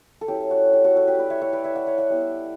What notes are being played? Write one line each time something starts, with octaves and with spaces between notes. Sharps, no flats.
A4
F#3 C#4 E4 G4
F#4
G4
F#4 A4
F#4 A4
G4 B4
A3 E4 B4 D5
C#5 E5
C#5 E5
B4 D5
C#5 E5
D5 F#5
C#5 E5
D5 F#5
G3 B3 E4